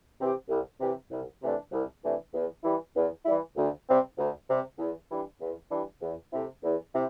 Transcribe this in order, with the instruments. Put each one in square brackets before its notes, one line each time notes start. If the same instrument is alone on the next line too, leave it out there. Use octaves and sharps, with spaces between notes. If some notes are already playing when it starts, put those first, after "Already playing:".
[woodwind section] C3 E3 C4 G4
C2
C3 E3 C4 G4
C2
C3 E3 A3 D4
C2
C3 E3 A3 D4
E2
E3 G3 E4
E2
E3 G3 E4
D2
C3 G3 C4
D2
C3 G3 C4
E2
E3 G3 D4
E2
E3 G3 D4
E2
C3 A3 C4 E4
E2
C3 C4 E4